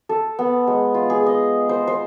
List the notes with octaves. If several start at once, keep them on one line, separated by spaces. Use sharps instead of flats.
A4
B3
G#3
F4
G#4
D#5
C5
C5